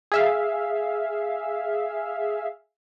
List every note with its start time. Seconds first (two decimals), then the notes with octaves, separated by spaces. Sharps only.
0.12 G#4 E5 F5